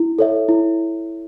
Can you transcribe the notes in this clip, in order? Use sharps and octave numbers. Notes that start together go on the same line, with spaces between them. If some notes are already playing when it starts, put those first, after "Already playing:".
Already playing: E4
A4 C#5 E5
E4